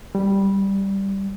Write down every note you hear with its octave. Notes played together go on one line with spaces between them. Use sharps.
G3